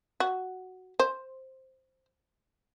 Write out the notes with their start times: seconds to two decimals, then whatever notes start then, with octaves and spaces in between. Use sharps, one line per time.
0.20 F#4
1.00 C5